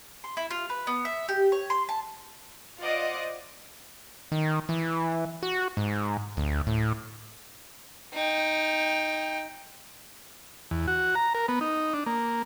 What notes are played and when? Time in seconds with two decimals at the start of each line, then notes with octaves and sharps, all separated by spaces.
0.24 C6
0.37 E4
0.50 F4
0.69 B4
0.87 B3
1.05 E5
1.28 G4
1.52 C#5
1.70 C6
1.89 A5
2.80 F4 C5 D5 D#5 F#5 D6
4.32 D#3
4.69 E3
5.43 F#4
5.77 G#2
6.37 D2
6.67 A2
8.14 D#4 G5
10.71 E2
10.88 F#4
11.15 A#5
11.35 A#4
11.48 B3
11.61 D#4
11.94 D4
12.06 A#3